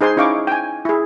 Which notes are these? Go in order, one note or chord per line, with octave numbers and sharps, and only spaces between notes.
D#4 G#4 C5 G#5 C6
C#4 D#4 E4 F5 C#6 D6
G5 G#5
E4 G#4